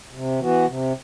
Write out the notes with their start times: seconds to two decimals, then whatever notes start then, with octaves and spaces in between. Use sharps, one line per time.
0.13 C3
0.39 E3 B3 F#4
0.66 C3